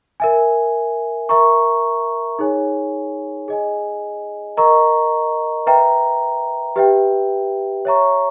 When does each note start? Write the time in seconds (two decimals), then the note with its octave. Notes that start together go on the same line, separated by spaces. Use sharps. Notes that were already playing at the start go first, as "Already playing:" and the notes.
0.20 A#4 E5 G#5
1.29 A#4 E5 A#5 C#6
2.39 D#4 G#4 C#5 G#5
3.48 G#4 D#5 G#5
4.57 A#4 D#5 A#5 C#6
5.66 B4 E5 G5 A#5
6.76 G4 B4 E5 G5
7.85 C#5 E5 A#5 C#6